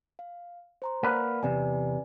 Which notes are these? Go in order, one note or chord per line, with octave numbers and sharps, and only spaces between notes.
F5
C5 A#5 C6
A#3 B4 D5 F#5
E2 C3 B4 D5 G#5